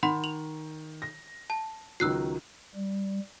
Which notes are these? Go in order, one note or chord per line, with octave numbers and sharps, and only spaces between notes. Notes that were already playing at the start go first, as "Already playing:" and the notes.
D#3 F#5 B5 C6
F7 F#7
A#6
A5
C#2 D#3 F#3 E6 F#6 C7
G3